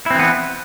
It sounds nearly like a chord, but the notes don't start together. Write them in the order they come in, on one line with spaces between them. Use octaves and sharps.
E4 C4 E3 B3